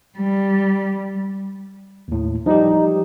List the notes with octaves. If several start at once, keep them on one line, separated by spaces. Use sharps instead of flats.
G3
D#2 A2
F3 G3 D#4 G4